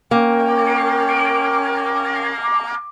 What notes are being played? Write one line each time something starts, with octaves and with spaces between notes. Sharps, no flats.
A#3 C#4 A#4 G5 C#6